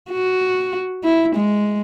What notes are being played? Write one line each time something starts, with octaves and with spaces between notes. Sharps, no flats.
F#4
E4
G#3